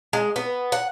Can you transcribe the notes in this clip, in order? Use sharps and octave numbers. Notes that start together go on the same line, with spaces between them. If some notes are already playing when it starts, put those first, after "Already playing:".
G#3
B3
F#5